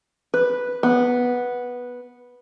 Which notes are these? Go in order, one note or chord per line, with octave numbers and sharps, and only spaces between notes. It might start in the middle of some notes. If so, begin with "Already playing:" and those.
B4
B3